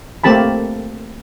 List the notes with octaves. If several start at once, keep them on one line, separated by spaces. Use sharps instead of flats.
A3 A#3 C4 G4 A5 B5